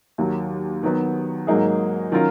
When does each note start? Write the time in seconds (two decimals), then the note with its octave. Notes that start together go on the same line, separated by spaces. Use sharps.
0.18 D#2 D#3 F#3
0.83 D#3 F#3 B3
1.47 G#2 F#3 A#3 D#4 G#4
2.12 D#3 F#3 C#4 F4 A#4